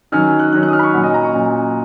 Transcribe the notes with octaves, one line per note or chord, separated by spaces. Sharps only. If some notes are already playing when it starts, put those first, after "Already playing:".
D#3 F#3 C#4 F6
F#6
D#3 F#3 C#4 F#6
F#6
D#6
F6
B5
C#6
A#2 F#3 C#4 F#5
D#5
A#5
C#6
A#2 F#3 C#4